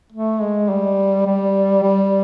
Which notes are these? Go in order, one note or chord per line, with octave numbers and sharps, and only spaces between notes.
A3
G#3
G3
G3
G3